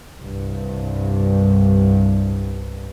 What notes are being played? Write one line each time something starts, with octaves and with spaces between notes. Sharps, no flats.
C2 G2